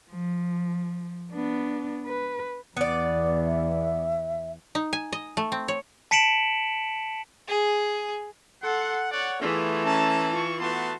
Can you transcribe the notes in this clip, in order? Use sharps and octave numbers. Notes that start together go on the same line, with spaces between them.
F3
B3 D4
B4
E2 B3 D5
E5
D#4
G#5
D#5
A3
C4
C#5
A5 B6 C#7 D7 E7 F#7
G#4
A4 F#5 C6
C#5 D5 F#5
E3 A3 B3 E4 F4 G#4
C#4 A5 A#5
F4 C#6
A3 B3 F#4 A5 C6